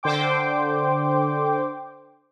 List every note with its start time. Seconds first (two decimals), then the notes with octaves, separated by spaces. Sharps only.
0.03 D3 C5 G5 D6